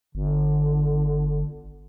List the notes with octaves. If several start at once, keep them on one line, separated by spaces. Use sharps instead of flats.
G1 D3